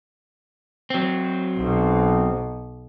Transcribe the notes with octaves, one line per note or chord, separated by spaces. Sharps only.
F#3 C4
B1 B2